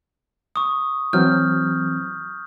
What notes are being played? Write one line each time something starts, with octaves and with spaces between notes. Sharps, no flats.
C#6 D#6
E3 F#3 C4 F6 G6